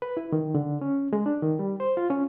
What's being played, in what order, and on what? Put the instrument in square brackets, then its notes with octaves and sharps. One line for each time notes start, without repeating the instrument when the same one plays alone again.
[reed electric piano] B4
E4
D#3
D3
C#4
G#3
D4
D#3
G3
C5
F4
C#4